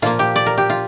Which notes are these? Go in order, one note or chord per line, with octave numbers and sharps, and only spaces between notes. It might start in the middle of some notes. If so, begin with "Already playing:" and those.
A#2 F3 A#3 F4
G4
D5
A#4
G4
F4